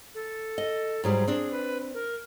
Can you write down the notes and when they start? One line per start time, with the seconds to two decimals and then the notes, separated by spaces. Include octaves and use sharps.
0.14 A4
0.58 D#5
1.04 G#2 F#3 G3 G#4
1.27 C4 D4
1.51 B4
1.94 A#4